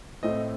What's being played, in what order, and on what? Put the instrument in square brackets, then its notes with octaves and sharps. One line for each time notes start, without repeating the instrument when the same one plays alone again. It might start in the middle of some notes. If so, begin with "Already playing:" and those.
[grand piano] A2 A3 C4 D#5